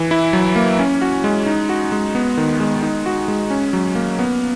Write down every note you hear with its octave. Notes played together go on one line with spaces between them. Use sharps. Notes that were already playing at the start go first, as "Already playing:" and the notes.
Already playing: E3
E4
F#3
A#3
C#4
F#4
G#3
D#4
F#4
G#3
B3
D#3
G#3
D#4
F#4
G#3
C#4
F#3
A#3
B3